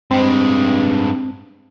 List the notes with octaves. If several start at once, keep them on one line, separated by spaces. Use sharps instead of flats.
G2 G#3 C4